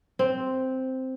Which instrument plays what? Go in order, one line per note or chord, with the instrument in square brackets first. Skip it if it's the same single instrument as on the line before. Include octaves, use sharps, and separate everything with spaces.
[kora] C4